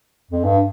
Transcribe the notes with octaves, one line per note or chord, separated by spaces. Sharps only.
F2
G2